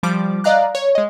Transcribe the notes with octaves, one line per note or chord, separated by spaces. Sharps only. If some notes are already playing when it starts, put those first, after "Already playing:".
F3 G3 D6
D5 D#5 F5 A#5 F#6
C#5
G#3 D#5